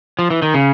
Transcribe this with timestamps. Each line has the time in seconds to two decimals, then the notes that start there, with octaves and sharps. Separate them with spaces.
0.19 F3
0.30 E3
0.42 D#3
0.54 C#3